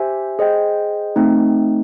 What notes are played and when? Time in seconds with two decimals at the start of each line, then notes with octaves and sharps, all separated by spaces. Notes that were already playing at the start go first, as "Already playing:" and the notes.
Already playing: G4 C5 E5 G#5
0.39 G#4 C5 D#5 G5
1.16 A3 C4 D#4